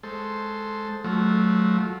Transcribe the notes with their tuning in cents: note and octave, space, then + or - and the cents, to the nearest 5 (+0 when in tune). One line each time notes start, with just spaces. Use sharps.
G#3 +20 A4 +0 C5 +0
F#3 +0 A3 -20 F4 +0